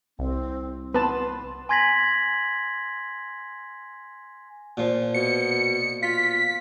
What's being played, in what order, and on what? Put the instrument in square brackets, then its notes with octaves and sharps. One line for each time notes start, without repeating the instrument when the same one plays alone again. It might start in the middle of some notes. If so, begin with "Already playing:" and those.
[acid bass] C2 [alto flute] C4
[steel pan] B3 A5 [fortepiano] B4 [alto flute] C6
[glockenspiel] G#5 C6 G#6 A#6 B6 F#7
[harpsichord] A#2 F3
[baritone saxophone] B2 [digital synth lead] C#7
[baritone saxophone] F4 [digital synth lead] B6